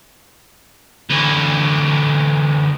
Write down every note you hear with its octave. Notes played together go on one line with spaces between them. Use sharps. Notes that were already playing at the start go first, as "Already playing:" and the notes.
D2 E3